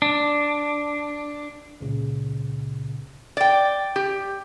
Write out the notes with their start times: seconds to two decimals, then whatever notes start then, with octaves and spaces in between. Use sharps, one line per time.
0.02 D4
1.81 C#2 A#2 C#3
3.37 D5 G5
3.96 G4